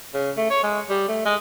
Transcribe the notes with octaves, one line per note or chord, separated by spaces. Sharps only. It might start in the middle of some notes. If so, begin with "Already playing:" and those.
C#3
A3
C#5
G#3
G3
A3
G#3